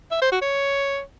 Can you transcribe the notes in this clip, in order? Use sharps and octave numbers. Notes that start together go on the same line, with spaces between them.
E5
C5
F#4
C#5